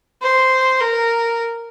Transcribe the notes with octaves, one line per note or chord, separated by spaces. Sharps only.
C5
A#4